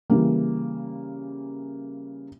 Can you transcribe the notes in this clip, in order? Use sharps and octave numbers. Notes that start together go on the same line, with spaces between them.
C#3 E3 G3 A#3